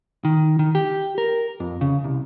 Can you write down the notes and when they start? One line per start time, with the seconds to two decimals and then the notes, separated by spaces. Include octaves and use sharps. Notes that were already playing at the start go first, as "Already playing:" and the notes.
0.25 D#3
0.59 D#3
0.75 G4
1.18 A#4
1.60 F2
1.81 C#3
2.04 C2